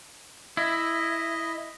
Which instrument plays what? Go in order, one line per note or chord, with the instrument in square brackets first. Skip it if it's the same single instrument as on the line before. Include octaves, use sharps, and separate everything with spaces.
[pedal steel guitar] E4 [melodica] D#5